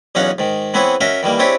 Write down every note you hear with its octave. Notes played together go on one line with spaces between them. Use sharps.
B1 E2 C#4 D#4 F5 F#5
G#2 D#3
E3 B3 C4 E4 G#4 C#5
C#4 F#4 A#4 D#5 E5
D#3 E3 G3 A#3
C4 D4 E4 G4 G#4 C#5